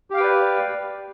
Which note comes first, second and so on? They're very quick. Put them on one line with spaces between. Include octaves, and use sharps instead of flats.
G4 F5 G5 B4 D5